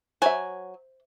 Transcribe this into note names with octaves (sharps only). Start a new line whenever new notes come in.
F#3 C5 E5 G#5